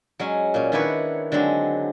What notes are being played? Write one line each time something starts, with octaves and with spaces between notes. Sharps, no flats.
F#3 G#3 C#4
A#2 C#4
D#3 D4 E4 F#4 B4 C#5
D3 F#3 G#3 C4 D4